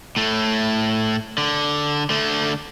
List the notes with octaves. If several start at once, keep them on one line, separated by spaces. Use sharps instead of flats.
A2 A3
D3
D3 A3